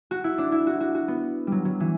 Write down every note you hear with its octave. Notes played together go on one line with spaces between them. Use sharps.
F#4
E4
D4
E4
F#4
F#4
F#4
B3
F#3 G3
F#3
E3